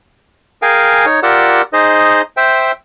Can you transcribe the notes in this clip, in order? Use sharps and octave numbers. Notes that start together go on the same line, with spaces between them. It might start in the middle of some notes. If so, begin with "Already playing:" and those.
G#4 A#4 F5 G5 G#5
D#4 C#5
F4 G4 A#4 D5 F#5 E6
D#4 G#4 C5 D#5
C5 E5 G5